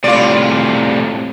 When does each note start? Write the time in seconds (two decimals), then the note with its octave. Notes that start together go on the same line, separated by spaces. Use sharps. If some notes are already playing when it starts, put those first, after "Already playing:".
0.04 A2 C3 F4 D5